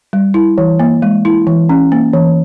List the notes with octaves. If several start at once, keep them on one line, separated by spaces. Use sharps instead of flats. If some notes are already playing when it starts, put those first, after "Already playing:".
G3
E4
E3
A#3
G#3
E4
E3
C#4
A#3
E3